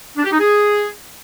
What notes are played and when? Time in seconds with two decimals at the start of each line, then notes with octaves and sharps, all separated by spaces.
0.16 D4
0.24 G4
0.32 D#4
0.39 G#4